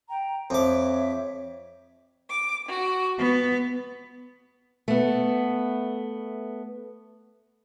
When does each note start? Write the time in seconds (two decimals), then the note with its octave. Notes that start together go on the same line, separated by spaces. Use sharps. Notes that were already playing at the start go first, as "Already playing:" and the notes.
0.09 G5 A#5
0.50 F2 C#5 E5 D6
2.29 D6
2.67 F#4
3.18 B3
4.88 A3 B3